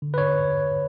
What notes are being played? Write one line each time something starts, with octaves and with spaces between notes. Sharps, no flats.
D3
B4
D3 C#5